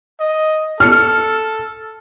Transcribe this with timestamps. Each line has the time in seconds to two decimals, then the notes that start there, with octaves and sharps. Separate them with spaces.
0.20 D#5
0.80 A4 F6 C#7